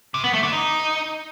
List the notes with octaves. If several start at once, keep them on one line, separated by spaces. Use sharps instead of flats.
C3
B3
A3
D3
D#4